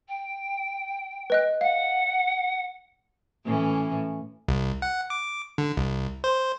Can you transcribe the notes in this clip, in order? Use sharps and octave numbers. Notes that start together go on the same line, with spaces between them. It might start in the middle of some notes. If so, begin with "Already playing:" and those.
G5
B4 D#5 F#6
F5 F#5
A2 E3 C#4
C2
F#5
D6
D3
C2
C5